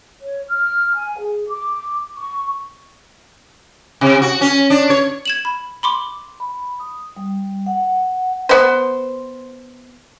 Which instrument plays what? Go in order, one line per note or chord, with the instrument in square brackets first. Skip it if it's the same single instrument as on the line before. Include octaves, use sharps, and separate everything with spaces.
[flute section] C#5
F6
G#5
G#4
D6
C#6
[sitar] C3
F#4
C#4
D4
C#5
[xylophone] G#6 E7 F#7
B5
B5 C6 D6
[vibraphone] B5
D#6
G3
F#5
[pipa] B3 C5